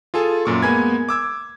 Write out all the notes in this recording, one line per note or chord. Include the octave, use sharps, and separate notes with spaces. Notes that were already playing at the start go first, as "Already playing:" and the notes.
F4 G#4 A4 G#5
F#2 A#2 C#6
G#3 A#3 B3 G#5 B5 G#6
D6 E6 G#6